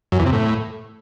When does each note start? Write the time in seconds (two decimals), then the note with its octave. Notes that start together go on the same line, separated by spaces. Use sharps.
0.12 F#2
0.19 E2
0.26 C3
0.33 A2